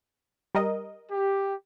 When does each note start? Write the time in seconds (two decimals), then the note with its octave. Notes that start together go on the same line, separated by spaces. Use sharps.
0.55 G3 A#4 D#5
1.11 G4